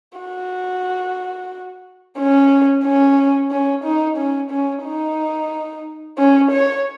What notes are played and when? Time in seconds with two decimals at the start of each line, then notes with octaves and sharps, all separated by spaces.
0.19 F#4
2.18 C#4
2.84 C#4
3.51 C#4
3.84 D#4
4.17 C#4
4.51 C#4
4.84 D#4
6.18 C#4
6.51 C#5